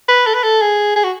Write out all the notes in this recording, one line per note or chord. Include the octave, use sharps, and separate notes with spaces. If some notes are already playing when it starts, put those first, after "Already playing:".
B4
A4
B4
A4
G#4
G#4
F#4